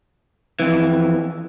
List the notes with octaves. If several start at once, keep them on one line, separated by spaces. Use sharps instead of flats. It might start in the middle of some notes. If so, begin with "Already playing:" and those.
F2 E3